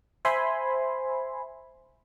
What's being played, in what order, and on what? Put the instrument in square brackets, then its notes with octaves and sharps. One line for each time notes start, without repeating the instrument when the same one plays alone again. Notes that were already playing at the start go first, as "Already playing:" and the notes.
[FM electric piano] C5 E5 G#5 B5 C6